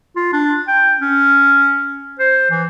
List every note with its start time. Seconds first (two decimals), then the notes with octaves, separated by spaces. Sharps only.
0.16 F4
0.33 D4
0.68 G5
1.00 C#4
2.19 C5
2.51 E3